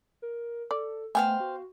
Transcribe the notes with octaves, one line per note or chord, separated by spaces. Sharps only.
A#4
A4 D5
A3 B3 C5 F5 G5 G#5
F#4